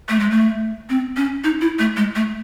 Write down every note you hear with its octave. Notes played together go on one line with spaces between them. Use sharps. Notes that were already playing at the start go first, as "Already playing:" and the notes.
A3
G#3
A3
C4
C#4
D#4
E4
A3
G#3
A3